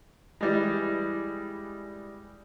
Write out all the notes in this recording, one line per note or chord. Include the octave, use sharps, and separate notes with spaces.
E3 G3 G#3